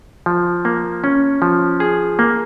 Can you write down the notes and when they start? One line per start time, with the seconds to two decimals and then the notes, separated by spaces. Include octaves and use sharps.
0.26 F3
0.65 A#3
1.04 C#4
1.42 F3
1.80 G#4
2.19 A#3